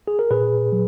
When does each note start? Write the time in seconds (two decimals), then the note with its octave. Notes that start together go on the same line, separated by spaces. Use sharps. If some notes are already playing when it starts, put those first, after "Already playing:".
0.08 G#4
0.19 A#4
0.31 A#2 G#4 B4
0.72 F#3